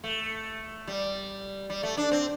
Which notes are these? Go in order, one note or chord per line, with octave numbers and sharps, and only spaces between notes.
A3
G3
G3
A3
D4
C4